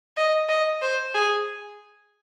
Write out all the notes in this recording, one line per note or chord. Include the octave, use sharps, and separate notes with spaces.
D#5
D#5
C5
G#4